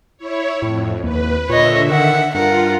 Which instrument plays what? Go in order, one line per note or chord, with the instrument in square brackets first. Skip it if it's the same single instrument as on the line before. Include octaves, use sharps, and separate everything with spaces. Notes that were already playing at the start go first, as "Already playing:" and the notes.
[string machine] E4 C#5
[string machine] F2 [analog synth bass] A2
[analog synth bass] D#2 [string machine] B4
[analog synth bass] A#2 [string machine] D3 E5 [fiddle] C#5 D#5
[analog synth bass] D#3 [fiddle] F#5
[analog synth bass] G2 [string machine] F4 [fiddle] A#4 F#5